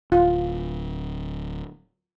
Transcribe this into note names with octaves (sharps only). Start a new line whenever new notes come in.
D1 F4